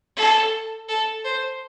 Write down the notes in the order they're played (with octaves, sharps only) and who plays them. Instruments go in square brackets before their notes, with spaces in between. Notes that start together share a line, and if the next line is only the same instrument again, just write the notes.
[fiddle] A4
A4
C5